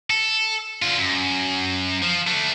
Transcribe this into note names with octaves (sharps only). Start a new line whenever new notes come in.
A4
D3 F4
F#2
F3
A3 D4